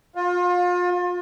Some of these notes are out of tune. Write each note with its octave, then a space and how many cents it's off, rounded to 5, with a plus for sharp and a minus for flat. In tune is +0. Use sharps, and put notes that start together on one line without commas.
F4 +30